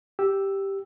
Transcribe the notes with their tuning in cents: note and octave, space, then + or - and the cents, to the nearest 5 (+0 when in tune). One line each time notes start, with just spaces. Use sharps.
G4 +0 E6 +0